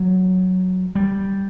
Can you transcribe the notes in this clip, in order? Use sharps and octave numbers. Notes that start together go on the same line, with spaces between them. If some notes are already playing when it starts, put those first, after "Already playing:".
Already playing: F#3
G3